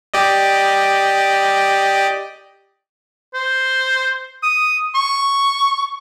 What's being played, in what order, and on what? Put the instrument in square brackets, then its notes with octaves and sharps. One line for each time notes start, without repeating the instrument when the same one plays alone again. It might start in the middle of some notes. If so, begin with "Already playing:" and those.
[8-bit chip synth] G4 D5 D#5
[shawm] C5
D#6
C#6